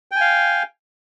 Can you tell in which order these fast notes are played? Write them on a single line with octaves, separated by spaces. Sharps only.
G5 G#5 F5